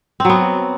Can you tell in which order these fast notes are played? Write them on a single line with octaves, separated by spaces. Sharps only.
C4 F#3 B3